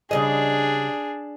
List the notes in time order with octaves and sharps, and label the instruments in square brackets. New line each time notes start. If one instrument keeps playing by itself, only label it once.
[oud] C#3 G3 D#5 [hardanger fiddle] D4 G#4